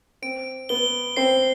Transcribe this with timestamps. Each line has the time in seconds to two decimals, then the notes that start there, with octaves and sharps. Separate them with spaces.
0.22 C4 D7
0.69 B3 G7
1.17 C4 C7